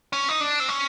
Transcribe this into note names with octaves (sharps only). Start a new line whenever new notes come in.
C#4
D#4
D4
C4
C#4